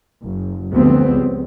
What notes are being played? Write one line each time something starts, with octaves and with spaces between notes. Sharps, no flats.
F#1
D2 F3 G3 B3 C4
C#2